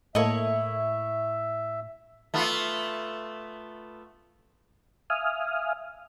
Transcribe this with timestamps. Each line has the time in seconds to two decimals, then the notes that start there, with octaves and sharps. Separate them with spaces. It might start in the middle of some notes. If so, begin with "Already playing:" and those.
0.15 A2 A#3 E4 A4 C#5 D#5 E5
2.34 A3 B3 F4
5.10 E5 F5 G#5 D#6 F6